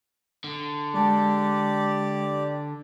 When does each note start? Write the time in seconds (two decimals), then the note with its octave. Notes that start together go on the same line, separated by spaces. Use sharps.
0.44 D3
0.94 G#3 G4 D5 A5